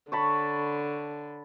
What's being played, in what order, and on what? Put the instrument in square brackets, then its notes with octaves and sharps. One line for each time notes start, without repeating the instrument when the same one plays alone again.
[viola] D3 [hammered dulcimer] C#5 A5 B5